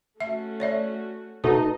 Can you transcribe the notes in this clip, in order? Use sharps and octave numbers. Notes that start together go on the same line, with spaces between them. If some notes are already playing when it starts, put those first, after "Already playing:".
A3 C#4 F#4 E5
C#5 D5 E5
B2 A3 B3 D#4 F#4 A4 D#5